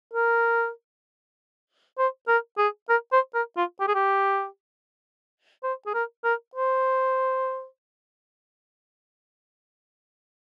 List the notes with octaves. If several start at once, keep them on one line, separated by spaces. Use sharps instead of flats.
A#4
C5
A#4
G#4
A#4
C5
A#4
F4
G4
G#4
G4
C5
G#4
A#4
A#4
C5